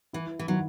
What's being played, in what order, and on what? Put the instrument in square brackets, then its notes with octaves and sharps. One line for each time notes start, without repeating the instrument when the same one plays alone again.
[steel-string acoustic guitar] E3 [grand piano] E4
[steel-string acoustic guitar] E3
[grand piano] D#3 [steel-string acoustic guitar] F#3